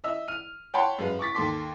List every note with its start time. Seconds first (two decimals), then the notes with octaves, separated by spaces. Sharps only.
0.04 D#5 E5 E6
0.28 F6 D#7
0.74 C#5 F#5 G5 A5 B5 C6
0.98 F#2 G#3 B4 F5
1.19 C#6 D6 A6 B6
1.34 D#2 A4 C6 D6 B6